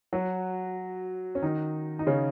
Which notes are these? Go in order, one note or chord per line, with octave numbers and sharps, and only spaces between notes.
F#3 F#4
C#4
D#3 D#4
D#4
C#3 C#4